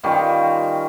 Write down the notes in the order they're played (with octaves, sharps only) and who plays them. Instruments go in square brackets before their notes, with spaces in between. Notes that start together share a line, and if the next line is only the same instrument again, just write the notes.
[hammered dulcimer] D#3 G3 C#4 F4